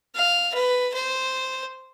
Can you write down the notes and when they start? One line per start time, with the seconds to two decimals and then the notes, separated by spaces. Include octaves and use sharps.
0.15 F5
0.54 B4
0.94 C5